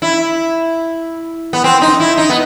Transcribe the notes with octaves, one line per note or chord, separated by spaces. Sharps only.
E4
B3
C4
D#4
E4
D#4
B3